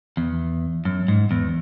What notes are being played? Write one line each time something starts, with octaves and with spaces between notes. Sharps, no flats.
E2
F#2
G#2
E2